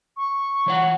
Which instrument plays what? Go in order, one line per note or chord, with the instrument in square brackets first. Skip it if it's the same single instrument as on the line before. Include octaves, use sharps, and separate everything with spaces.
[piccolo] C#6
[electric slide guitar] E3 C#5 F#5